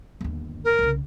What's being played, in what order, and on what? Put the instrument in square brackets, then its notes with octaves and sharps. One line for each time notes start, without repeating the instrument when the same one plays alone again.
[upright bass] G1 D#2
[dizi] A#4
[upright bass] C2 C#3